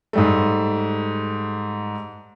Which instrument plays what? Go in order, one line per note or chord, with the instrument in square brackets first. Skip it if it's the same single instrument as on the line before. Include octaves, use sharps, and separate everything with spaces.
[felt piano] G#2 G3 A3